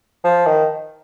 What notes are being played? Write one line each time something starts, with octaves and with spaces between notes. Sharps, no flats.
F3
D#3